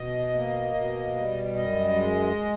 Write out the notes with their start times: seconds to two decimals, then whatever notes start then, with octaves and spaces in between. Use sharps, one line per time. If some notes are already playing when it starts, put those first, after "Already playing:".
Already playing: B2 D#5
0.34 A#3
0.74 B2
1.15 G3
1.55 F#2 D#5
1.96 G#3